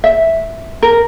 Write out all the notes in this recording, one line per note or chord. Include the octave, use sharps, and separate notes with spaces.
E5
A#4